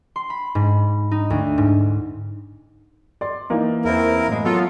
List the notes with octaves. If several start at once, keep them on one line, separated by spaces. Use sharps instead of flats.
C6
B5
G#2
D#4
D2
G#2
D5 C6
E3 A#3 D#4
E2 C4 E4 A#4
F#2 A2 G#3
F#3 B3 F4 A4